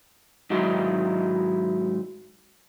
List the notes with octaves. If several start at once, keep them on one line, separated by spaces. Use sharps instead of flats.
G#2 D#3 F#3 G#3 D#4 E4